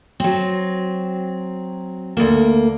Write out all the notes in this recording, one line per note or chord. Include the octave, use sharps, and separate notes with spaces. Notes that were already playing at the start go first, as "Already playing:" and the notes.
F#3 C4
D2 A#3